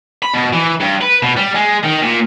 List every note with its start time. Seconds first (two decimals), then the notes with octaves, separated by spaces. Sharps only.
0.23 B5
0.34 B2
0.53 E3
0.81 G2
1.02 B4
1.23 B2
1.37 G3
1.55 G#3
1.83 D#3
2.02 A#2